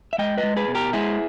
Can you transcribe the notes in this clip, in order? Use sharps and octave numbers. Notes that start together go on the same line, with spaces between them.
E5
G#3 D#5 G5
B4 D#5
G#3
G#4 B4
B2
G4 A#4
G#3 E4 G#4